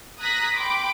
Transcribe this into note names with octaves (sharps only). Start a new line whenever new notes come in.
A#5 D#6 F#6 G#6 A#6 B6
G5 B5 C6 D6